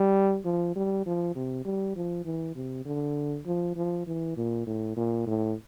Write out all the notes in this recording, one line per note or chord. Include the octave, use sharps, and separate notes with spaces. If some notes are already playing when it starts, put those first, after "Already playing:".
Already playing: G3
F3
G3
F3
C3
G3
F3
E3
C3
D3
F3
F3
E3
A#2
A2
A#2
A2